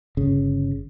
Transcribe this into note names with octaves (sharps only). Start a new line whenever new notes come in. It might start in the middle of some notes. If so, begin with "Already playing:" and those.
G1 C#3